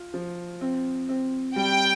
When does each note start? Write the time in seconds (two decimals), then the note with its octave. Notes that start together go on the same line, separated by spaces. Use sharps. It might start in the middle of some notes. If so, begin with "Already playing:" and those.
Already playing: F4
0.14 F3
0.61 C4
1.09 C4
1.56 G3 G5